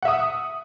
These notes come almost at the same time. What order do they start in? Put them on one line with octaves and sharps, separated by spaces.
F#5 E5 D#6